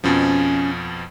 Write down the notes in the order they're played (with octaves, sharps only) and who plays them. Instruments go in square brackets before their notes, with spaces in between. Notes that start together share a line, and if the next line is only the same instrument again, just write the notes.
[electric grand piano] F2 B2 F3 [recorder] C#4